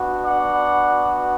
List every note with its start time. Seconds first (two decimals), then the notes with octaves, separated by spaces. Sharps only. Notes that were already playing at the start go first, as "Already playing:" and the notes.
Already playing: B3 D4 F#4
0.25 D5 F#5